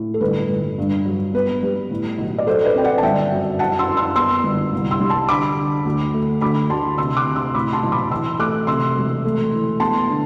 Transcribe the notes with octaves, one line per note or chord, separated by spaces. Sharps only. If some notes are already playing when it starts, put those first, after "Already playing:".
Already playing: A2
A4
G1 B4
G1
G2
F#3
B3 B4
G3
A2
B1
D5
F#3 A4 C5
B4 D5
C4 G5
D5 F#5
A5
G1 E5 G5
F#2
F#2 F#5 A5
C6 E6
F#2
C6 E6
B3 C6 E6
G1
C2
C6 E6
G3
A5 C6
D3 B5 D6
D3
D2
A3
D2 B5 D6
D2 A5 C6
C3 C6 E6
D6 F#6
C3
C6 E6
A2 B5 D6
A5 C6
B1
B5 D6
E3 C6 E6
A3 D6 F#6
C3 C6 E6
E1
A3
E3
B3 A5 C6
D3